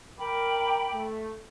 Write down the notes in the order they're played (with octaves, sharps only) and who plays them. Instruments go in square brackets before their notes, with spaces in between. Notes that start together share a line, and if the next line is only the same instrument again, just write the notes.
[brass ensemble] A#4 [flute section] G5 B5 D6
[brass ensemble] A3